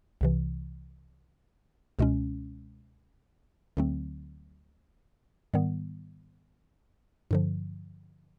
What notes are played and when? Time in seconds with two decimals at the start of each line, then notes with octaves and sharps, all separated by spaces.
0.21 C2 C3 E3
1.99 C#2 B2 G#3 C#4
3.77 D2 D3 F#3 A3 C4
5.54 G#2 D#3 G3 B3
7.31 G2 D3 F3